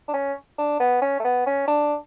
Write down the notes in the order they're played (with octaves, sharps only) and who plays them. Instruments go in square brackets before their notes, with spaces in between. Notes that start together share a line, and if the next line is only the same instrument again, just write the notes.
[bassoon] D4
C#4
D4
B3
C#4
A3
B3
C#4
D4